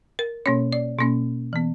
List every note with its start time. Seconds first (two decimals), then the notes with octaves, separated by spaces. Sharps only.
0.19 A#4
0.46 B2 A#3 C#4 C#5
0.73 D5
0.99 B2 A#3 C#4
1.53 E3 B3